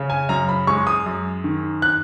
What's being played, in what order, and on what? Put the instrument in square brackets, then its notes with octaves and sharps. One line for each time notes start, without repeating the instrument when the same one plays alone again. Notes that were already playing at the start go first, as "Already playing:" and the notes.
Already playing: [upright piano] C#3
G#5
F#2 A#5
B5
G#3 C#6
D#6
F#2
D#3
F#6